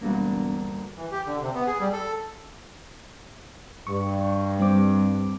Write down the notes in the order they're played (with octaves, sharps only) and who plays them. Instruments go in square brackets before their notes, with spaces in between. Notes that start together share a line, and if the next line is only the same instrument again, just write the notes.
[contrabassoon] E1 [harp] D2 G2 A#3
[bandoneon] E3
G4
D3
C3
B3
G#4
G3
A4
[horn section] G2 [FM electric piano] C#6
[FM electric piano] G3 C4 D6